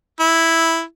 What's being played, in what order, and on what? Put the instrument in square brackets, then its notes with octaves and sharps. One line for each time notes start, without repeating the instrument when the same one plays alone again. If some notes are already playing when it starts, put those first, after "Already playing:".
[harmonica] E4